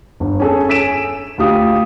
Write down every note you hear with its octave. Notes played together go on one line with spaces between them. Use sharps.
G1
C#4 G#4 A4
G#5 E6 B6 D7 E7
D2 F4 G4 D#6